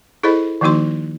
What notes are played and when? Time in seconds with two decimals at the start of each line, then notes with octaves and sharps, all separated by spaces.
0.23 E4 G#4 A4 C5 D#5 B5
0.61 D#3 F3 A#3 D#4 F#4 C6